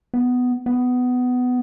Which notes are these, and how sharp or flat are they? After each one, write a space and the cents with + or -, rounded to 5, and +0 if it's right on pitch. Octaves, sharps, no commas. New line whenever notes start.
B3 +10
B3 +15